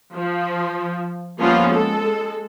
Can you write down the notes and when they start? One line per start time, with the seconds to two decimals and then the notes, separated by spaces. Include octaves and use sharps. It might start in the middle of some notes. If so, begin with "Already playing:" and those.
0.13 F3
1.40 F3 G3 A#3 B3 C#4 F4
1.69 G#3 A4